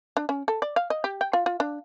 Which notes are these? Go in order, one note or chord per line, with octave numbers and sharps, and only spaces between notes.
D4
C#4
A4
D5
F5
D#5
G4
G5
F4
F4
D4